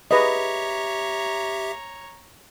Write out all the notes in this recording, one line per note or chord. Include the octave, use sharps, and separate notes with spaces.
G4 G#4 B4 C#5 D#5 E5 A#5